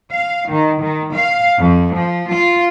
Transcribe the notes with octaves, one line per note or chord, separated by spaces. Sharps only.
F5
D#3
D#3
F5
F2
F3
F4